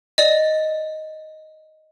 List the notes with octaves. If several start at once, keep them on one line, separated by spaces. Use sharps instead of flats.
D5 D#5